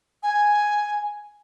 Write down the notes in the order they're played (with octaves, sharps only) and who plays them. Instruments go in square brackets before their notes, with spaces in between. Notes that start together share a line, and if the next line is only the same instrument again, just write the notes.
[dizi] G#5